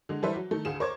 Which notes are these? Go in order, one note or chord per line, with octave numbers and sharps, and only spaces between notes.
D3 G#3
E3 G3 A4 B4 C5 E5
F#3
D#3 A3
D2 G#4 F5 E7
A#4 C5 C#5 C#6 D6 G#6